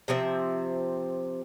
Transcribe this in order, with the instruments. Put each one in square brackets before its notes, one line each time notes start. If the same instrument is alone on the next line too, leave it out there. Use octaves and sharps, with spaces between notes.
[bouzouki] C3 F3 C4 E5